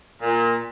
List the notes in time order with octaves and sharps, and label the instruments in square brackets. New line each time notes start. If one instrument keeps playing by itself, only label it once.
[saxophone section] A#2